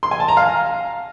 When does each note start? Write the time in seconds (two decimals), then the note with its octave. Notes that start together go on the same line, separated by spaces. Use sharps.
0.03 C6
0.11 G#5
0.20 A5
0.28 A#5
0.37 F5